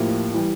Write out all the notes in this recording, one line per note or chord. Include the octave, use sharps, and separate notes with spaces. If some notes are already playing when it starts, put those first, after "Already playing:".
Already playing: A2 F3 A#3 E4 G4
E3 G3